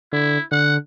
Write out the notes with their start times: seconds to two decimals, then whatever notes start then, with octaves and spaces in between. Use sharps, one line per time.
0.12 D3 E4
0.52 D3 F#5